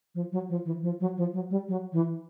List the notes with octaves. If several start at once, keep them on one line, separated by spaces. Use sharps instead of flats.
F3
F#3
F3
E3
F3
F#3
F3
F#3
G3
F#3
E3